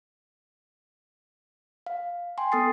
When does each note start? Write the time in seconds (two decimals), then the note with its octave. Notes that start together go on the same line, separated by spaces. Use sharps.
1.86 F5
2.38 G5 G#5 C6
2.52 B3 A4 D#6 A6 C7